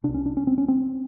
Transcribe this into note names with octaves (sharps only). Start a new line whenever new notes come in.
C2 C3 D4
C#4
D4
C#4
C4
C#4
C4